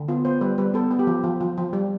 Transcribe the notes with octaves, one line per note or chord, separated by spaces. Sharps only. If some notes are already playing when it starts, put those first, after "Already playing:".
Already playing: D3
B3 F4
B3 C5
G3 B4
G3 B4
B3 A4
B3
G4
F3
F3
F3
F3
G3